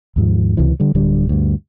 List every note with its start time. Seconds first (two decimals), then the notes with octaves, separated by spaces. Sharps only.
0.16 D#2 G#2 F3
0.57 C#2 C3 E3
0.80 D3 G3
0.95 D1 D3 G3
1.29 D2 G2